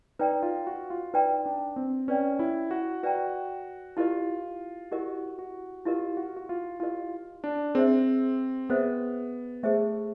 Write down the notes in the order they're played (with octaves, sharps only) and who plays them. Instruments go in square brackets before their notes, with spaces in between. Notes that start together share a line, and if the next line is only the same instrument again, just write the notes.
[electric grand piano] D#4 [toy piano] B4 D5 G5 A#5
[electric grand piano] F4
F#4
F4
[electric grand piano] D#4 [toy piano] B4 D5 G5 A#5
[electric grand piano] D4
C4
[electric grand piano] C#4 [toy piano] B4 D5 G5 A#5
[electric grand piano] E4
F#4
[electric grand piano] F#4 [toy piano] B4 D5 G5 A#5
[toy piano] E4 G4 A#4 D#5 [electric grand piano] F4
[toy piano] E4 G4 A#4 D#5 [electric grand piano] F#4
[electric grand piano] F#4
[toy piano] E4 G4 A#4 D#5 [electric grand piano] F4
[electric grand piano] F#4
F#4
F4
[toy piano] E4 G4 A#4 D#5 [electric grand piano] F4
[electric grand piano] D4
[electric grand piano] C4 [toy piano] G#4 C5 E5
[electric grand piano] B3 [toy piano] G#4 C5 E5
[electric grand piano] A3 [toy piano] G#4 C5 E5